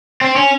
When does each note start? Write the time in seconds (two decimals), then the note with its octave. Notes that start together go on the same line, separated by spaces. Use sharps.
0.21 C4
0.36 C#4